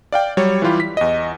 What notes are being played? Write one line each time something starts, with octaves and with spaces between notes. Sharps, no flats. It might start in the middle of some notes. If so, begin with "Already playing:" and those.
D5 F5 G5
F#3 G3 C#5
E3 G3 E4 F4 G4
B6
E2 D#5